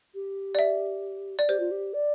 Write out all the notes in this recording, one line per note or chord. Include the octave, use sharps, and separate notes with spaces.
G4
D5
E5
D5
G4 C5
F4
G4
D5